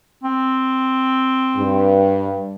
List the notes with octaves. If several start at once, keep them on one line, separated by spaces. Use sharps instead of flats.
C4
G2